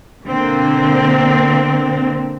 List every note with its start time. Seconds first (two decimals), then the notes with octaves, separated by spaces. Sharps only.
0.25 B2 D3 A#3 C4